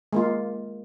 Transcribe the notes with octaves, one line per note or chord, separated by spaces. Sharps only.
G#3 A#3 F4